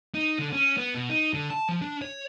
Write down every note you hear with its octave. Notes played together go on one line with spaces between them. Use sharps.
D#4
D3
C#4
B3
B2
D#4
D3
A5
F3
D4
C#5